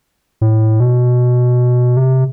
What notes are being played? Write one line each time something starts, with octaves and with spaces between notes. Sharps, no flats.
A2
B2
C3